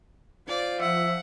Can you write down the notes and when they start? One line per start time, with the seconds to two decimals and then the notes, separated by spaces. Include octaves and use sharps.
0.48 F4 C5 D5
0.81 F3 E5 F#5